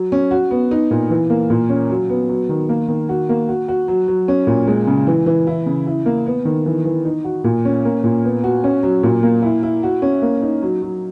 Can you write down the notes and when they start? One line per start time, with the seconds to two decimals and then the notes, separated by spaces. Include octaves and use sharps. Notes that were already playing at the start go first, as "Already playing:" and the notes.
Already playing: F#3
0.12 C#4
0.31 F#4
0.51 B3
0.71 D#4
0.91 A#2
1.10 E3
1.30 A#3
1.50 A#2
1.69 C#4
1.90 F#3
2.09 B3
2.29 F#3
2.49 D#3
2.69 A#3
2.88 D#3
3.09 F#4
3.29 A#3
3.49 F#4
3.68 F#4
3.88 F#3
4.08 F#3
4.28 C#4
4.47 A#2
4.67 G#3
4.87 C#3
5.07 E3
5.26 E3
5.47 E4
5.66 C#3
5.87 E4
6.06 A#3
6.26 B3
6.45 D#3
6.66 E3
6.85 E3
7.05 D#4
7.24 F#4
7.44 A#2
7.65 C#4
7.85 A#3
8.04 A#2
8.24 B3
8.44 F#4
8.64 C#4
8.83 F#3
9.03 A#2
9.23 A#3
9.42 E4
9.63 E4
9.83 F#4
10.02 C#4
10.22 A#3
10.42 D#4
10.62 F#3
10.82 F#3